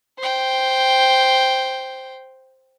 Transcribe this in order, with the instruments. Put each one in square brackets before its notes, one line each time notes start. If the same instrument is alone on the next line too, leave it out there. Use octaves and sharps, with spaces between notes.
[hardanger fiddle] C5 G5